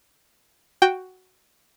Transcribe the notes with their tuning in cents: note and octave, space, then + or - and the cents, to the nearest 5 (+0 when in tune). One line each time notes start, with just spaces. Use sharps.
F#4 +5 G5 +0